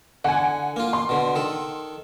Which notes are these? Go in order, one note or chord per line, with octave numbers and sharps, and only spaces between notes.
D3 F#5 G#5
A#3 F4
C6
B2 D3
D#3 A4